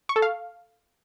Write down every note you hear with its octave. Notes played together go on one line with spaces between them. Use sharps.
C#6
A4
F5